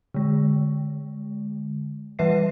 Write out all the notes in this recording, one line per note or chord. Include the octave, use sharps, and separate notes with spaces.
D3 G#3
E3 G3 B4 E5 C7